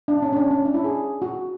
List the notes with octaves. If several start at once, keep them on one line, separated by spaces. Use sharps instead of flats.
D4
C#4
C#4
D4
C#4
D4
E4
G#4
F#4